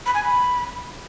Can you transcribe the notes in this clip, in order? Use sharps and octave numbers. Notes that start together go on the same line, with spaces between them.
B5
G#5
B5